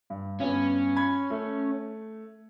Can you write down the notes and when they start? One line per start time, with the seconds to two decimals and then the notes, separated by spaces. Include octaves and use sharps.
0.10 G2
0.40 G2 B3 C#4
0.96 B5 G#6
1.30 A3